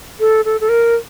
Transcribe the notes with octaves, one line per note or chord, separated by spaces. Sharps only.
A4
A4
A4
A#4